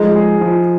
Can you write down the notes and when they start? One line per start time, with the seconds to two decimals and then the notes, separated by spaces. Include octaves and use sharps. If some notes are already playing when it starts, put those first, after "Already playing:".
Already playing: F3 G#3 D#4
0.16 G#4
0.41 F3